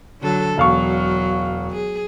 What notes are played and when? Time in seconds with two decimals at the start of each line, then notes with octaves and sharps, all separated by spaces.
0.21 D3 F#3 A4
0.57 E1 F#3 F5 C#6
1.72 G#4